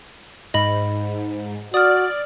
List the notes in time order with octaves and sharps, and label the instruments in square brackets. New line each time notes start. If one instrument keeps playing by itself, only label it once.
[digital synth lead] G#2 [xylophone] D#5 B5
[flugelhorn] F#4 [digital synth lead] D5 [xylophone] D#6 F6